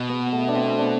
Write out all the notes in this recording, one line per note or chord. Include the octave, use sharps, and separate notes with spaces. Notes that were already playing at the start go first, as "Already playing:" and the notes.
Already playing: B2
B3
A3
D4
C4
D4